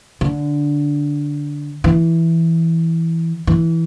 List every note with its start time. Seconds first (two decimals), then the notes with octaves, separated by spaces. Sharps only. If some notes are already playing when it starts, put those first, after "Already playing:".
0.21 D3
1.84 E3
3.47 E3